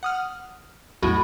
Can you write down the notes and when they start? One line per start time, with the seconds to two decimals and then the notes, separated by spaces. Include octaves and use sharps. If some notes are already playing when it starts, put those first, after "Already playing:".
0.03 F#5 D#6 F6
1.02 B1 E2 A2 F#4